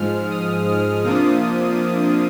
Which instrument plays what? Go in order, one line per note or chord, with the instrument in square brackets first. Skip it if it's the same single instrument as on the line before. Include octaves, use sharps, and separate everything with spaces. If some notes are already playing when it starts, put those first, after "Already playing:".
Already playing: [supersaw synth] G#2 F3 G#3 F6
D#6
F6
C3 F3 A#3 D4 F4 D#6